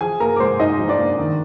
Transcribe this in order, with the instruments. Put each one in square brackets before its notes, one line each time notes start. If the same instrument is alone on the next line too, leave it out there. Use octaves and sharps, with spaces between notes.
[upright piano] F3 G#4 G#5
A#3 A#4 A#5
D6
G#2 C5 C6
G#2 D#4 D#5
F3
D4 D5
A#3
D#3